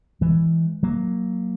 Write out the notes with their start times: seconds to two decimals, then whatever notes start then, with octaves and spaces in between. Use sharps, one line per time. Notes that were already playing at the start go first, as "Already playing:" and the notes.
0.21 E3 G#3
0.83 F#3 A#3